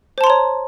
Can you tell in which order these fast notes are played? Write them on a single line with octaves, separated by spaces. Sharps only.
C5 A5 C6 A#5 C#5